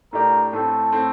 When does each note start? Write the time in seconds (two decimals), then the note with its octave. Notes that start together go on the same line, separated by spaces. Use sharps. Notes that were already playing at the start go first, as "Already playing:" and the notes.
0.13 A2 A3 D4 G4 A#4
0.53 A2 A3 C4 A4
0.92 A2 A3 C4